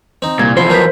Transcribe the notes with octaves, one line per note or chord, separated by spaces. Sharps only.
C4 D#4
C2 A#2 G#6
E2 F3 E4 C5
F#3 B3 F4 A#4 G6 B6